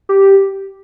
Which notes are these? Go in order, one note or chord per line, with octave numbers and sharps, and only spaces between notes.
G4